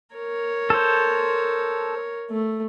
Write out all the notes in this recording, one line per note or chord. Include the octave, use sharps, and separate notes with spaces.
A#4 C#5
A4 C5
A3